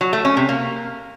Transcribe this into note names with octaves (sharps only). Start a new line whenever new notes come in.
F#3
A3
C#4
C3
A#3